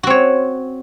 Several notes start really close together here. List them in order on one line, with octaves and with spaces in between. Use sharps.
F#4 C4 C#5